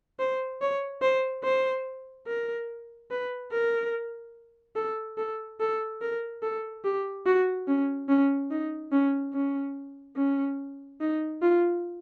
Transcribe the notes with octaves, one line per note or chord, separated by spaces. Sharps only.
C5
C#5
C5
C5
A#4
B4
A#4
A4
A4
A4
A#4
A4
G4
F#4
C#4
C#4
D#4
C#4
C#4
C#4
D#4
F4